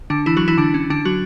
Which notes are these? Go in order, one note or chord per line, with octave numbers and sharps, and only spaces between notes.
D3 D4
E3 E4
F#3 F#4
E3 E4
D3 D4
C#4
D3 D4
F#3 F#4